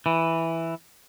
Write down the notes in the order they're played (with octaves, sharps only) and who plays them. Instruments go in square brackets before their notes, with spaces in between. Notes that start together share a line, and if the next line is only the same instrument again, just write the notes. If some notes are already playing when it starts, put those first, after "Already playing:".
[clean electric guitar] E3